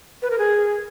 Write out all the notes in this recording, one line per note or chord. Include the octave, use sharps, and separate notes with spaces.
B4
A#4
G#4